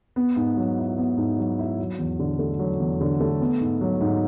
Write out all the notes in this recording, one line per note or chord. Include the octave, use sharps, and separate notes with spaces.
B3
G#2
F#3
E4
B3
G#2
F#3
E4
F#3
E2
D3
A3
F#3
E2
D3
A3
B3
G#2
F#3
G#2